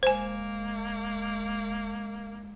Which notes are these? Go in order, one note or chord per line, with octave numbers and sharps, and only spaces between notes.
E1 G#3 A#3 C5 G#5